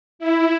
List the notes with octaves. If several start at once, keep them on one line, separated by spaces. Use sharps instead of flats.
E4